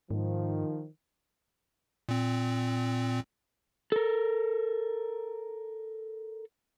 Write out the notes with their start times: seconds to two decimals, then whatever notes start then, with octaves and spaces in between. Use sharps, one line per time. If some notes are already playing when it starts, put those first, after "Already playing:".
0.11 G#2 D#3 F3
2.09 A#2 C4
3.92 A4 A#4